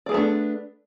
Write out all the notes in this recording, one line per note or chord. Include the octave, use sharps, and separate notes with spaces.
A3 B3 D4 G#4 D5